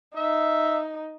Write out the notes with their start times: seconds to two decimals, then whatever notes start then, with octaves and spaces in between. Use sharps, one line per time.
0.16 D#4 E5